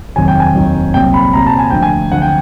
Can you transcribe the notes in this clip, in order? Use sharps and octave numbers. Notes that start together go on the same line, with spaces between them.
F1 D#2 D#3 F#3 G#5
G5
G#5
F1 D#2 D#3 F#3
C2 A#2 F#3 G5
B5
C2 A#2 F#3 A#5
A5
G#5
D2 D3 F3 G5
G#5
D2 D3 F3 F#5
G5